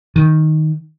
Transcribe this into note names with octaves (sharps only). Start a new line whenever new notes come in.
D#3